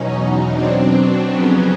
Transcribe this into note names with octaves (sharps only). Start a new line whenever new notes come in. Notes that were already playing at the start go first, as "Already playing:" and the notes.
Already playing: E2 B2 F#3 C#4 D#4
B2 F#3 C4 D4
F2 C#3 F#3 B3 C#4